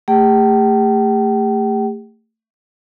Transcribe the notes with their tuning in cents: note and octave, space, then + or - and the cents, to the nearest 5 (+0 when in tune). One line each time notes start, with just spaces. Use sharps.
A3 +25 G4 +45 G5 -40